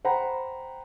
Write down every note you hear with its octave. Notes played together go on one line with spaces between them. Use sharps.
C5 F#5 G5 A#5 B5